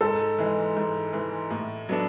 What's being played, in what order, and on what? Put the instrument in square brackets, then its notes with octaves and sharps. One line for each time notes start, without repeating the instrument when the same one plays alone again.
[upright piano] G#2 [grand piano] A4
[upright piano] E3 G#3
G#2
E3 G#3
A2
F#3 B3 D4 A4